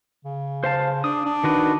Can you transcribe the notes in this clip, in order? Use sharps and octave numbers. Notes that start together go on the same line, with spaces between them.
C#3
C5 F5 A5
D4 D#6
D4
D#3 F#4 B4